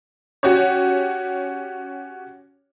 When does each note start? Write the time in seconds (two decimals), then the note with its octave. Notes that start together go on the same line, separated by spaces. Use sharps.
0.43 C#4 F#4 G4 C#5